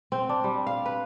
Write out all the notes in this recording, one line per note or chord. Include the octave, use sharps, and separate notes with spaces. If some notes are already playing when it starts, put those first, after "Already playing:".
C4
D4
G3
F5
B4